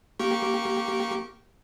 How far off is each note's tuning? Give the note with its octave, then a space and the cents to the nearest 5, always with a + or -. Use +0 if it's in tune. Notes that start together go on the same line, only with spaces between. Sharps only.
A#3 +0 G4 -20 C#6 -15